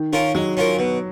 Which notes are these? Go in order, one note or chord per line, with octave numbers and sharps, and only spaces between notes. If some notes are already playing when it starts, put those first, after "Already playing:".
Already playing: D#3
D#3 C#4 F4 A#4
F#3 G#3
C#4 F4 A#4
B2